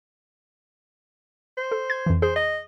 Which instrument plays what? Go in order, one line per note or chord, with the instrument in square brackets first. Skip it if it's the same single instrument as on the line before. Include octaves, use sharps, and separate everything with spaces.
[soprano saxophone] C5
[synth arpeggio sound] A4
G#6
F2 E3
[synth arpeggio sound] G#4 [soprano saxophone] C5
[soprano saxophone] D#5